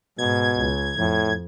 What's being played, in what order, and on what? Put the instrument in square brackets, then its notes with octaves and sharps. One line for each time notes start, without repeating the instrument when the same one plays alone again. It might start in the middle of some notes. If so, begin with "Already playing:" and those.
[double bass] G#2 [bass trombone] B2 [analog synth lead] G#6
[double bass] C#2
[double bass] F2 [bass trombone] A2